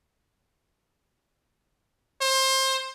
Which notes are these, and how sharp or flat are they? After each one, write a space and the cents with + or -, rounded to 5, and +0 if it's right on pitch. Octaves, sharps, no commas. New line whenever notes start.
C5 +25